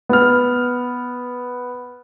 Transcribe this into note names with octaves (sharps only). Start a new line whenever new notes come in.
B3 F6